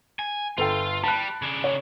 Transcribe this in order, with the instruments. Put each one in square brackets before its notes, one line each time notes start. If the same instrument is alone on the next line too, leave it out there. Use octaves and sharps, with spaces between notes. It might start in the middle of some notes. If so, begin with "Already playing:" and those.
[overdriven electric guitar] G#5
[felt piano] G1 A4 G5 [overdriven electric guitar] F4
[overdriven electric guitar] G3 [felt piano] A5 B5 F#6
[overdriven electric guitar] C#3 D4
[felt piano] C#5